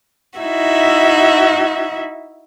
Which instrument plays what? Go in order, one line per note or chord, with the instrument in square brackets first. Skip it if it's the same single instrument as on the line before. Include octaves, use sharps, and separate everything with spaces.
[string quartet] D#4 E4 F#4 E5